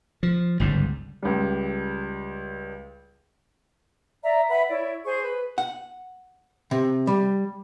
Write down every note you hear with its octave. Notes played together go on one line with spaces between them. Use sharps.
F3
G1 C#2 G#2 G3
C#2 G3
D5 E5 A#5
B4 E5 F#5 B5
E4 C#5 D5
G#4 C5 G#5 C#6
B4
F#5
C3
G3